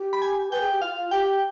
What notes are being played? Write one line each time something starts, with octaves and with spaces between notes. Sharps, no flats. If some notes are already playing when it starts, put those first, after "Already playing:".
Already playing: G4
B5
G#5
B4 G5
G#4
G4
F4 F5
G4 G5